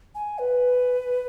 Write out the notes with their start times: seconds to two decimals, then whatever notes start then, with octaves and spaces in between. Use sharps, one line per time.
0.15 G#5
0.39 B4